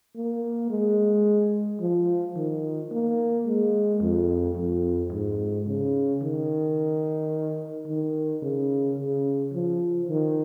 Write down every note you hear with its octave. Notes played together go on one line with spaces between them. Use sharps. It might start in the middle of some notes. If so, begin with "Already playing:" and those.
A#3
G#3
F3
D#3
A#3
G#3
F2
F2
G#2
C#3
D#3
D#3
C#3
C#3
F3
D#3